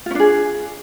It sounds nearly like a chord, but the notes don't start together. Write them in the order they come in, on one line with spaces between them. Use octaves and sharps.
F4 C#4 D4 G#4